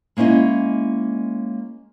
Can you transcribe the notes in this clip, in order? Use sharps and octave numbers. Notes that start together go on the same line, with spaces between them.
G#3 A#3 C#4 E4 D#5